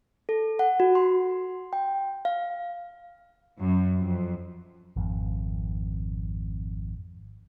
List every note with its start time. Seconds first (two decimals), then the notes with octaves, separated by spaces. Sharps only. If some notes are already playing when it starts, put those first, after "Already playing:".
0.29 A4
0.59 F#5
0.80 F#4
0.95 C6
1.73 G5
2.25 F5
3.58 F#2
4.00 F2
4.96 G#1 F2